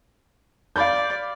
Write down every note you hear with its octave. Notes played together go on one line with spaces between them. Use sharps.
D5 F5 B5 G6